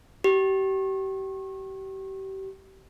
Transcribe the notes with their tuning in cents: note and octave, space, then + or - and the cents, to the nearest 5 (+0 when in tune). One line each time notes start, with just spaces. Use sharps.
G4 -30